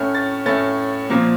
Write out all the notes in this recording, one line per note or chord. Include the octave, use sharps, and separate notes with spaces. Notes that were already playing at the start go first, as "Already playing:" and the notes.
Already playing: A2 A3 C#4 F6
A6
A2 A3 C#4 A6
A#2 F3 A#3